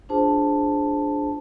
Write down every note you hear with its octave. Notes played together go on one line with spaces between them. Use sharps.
D4 F4 G#4 C5 A5